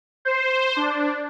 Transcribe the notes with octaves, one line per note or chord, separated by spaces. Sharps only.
C5
D4